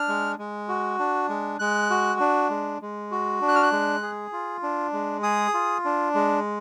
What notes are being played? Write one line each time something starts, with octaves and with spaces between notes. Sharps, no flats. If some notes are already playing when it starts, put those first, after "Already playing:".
Already playing: D4 F6
G#3
G#3
F#4
D4
G#3
G#3 F#6
F#4
D4
G#3
G#3
F#4
D4
F#6
F6
F#6
G#3
G#4
F4
D4
G#3
G#4 D#6
F4
D4
G#3